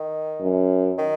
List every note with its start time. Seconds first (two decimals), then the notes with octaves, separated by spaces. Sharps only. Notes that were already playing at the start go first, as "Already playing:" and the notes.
Already playing: D#3
0.41 F#2
0.98 D#3